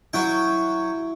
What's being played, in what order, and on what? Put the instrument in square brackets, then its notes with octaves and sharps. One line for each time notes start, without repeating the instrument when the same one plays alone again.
[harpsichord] F#3 F#4 G5 [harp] E4